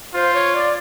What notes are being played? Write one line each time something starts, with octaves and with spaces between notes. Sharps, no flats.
F4 C5
C#5
D5